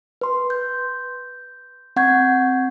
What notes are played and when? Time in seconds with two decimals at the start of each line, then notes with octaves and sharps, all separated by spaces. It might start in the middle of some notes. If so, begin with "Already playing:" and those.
0.21 B4 C6
0.50 G6
1.96 C4 F#5 C#6 G6 G#6